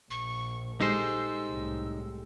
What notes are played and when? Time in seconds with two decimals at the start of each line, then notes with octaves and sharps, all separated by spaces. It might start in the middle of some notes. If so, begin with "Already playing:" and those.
0.10 A#1 C#6
0.80 G#3 D#4 G4 A4 C5 E6
1.49 C2 A2